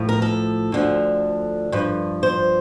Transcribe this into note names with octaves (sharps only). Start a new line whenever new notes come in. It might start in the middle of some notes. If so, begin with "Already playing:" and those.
Already playing: A2 F3
A#4
A4
D2 D3 F3
G2 F3
C5